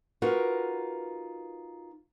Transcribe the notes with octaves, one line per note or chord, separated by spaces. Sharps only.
D#4 F4 F#4 A#4 B4